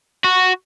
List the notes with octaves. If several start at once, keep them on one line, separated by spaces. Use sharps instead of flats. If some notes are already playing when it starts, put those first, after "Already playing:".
F#4